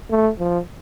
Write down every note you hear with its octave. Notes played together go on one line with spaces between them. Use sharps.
A3
F3